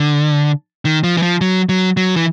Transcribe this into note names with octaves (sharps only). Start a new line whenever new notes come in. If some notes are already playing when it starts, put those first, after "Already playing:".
Already playing: D3
D#3
F3
E3
F3
F#3
F#3
F#3
E3